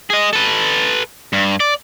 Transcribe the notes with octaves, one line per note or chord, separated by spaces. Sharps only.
G#4 D#5
A4 B4
G2
D5